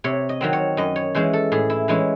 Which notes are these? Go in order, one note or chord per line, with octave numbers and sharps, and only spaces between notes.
C3 C#5
D#5
D#3 F#3 C4
C#5
F#2 D#5
C#5
E3 G#3 C#4 C5
A4
A2 G#4
E4
E3 G#3 C#4 E4